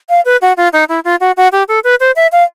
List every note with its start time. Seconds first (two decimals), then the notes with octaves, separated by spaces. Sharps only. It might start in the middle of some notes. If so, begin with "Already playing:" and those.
0.10 F5
0.25 B4
0.42 F#4
0.57 F4
0.73 D#4
0.89 E4
1.05 F4
1.20 F#4
1.37 F#4
1.52 G4
1.68 A4
1.84 B4
2.00 C5
2.16 E5
2.32 F5